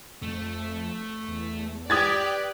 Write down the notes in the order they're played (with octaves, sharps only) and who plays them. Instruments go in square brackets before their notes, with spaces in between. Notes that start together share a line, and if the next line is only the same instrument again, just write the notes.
[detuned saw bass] F2 [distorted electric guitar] A3
[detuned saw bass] E2
[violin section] G4 D5 [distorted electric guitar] B4 [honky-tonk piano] D#6 G#6 A6